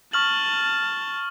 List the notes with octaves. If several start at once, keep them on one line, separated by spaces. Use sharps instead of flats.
A5 C#6 F6 F#7